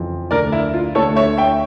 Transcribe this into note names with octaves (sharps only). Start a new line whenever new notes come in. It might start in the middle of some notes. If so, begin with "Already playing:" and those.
Already playing: F2 C#3 E3
D2 D3 A#4 D5
E4
F4
D2 D3 A4 C#5
C#5 E5
E5 G5